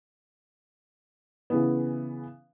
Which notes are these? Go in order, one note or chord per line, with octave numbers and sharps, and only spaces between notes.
C#3 E3 B3